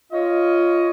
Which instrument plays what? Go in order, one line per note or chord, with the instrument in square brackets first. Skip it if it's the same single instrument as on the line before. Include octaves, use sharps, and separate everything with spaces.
[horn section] F4 C#5 D#5